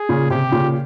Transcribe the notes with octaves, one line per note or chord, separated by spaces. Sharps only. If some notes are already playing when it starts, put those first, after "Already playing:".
Already playing: G#4
A#2 C#3
C3 G4
A#2 C#3